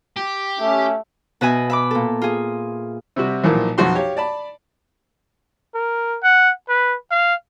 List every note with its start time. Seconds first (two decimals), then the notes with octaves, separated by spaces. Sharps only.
0.17 G4
0.59 A3 C#4
1.41 B2 B4 D#5 E5 G#5
1.70 E5 B5 D6
1.91 A#2 A4
2.22 F4 G#4
3.16 C3 G3 F#4
3.44 B1 A#2 E3 F3 A#3
3.78 B1 F2 F#4 C6
3.95 G4 C#5 F5
4.17 D5 A5 B5
5.75 A#4
6.23 F#5
6.69 B4
7.11 F5